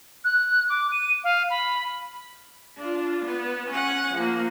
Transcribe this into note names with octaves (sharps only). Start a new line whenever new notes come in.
F#6
D6
D#7
F5
B5
D4 F4
B3
C#4 F#5
F3 A#3